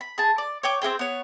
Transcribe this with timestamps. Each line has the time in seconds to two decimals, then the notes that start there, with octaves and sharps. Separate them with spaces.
0.01 B5
0.18 G#4 A5
0.38 D5
0.63 C#5 G5 D6
0.82 C4 E4 G#4 G5
0.99 B3 C#5